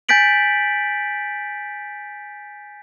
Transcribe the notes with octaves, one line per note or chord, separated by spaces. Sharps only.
G#5 G6 A6 B6 D7 F#7